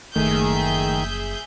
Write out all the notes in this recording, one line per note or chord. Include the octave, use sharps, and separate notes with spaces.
F#1 D#3 F3 A3 G#4 E5 G6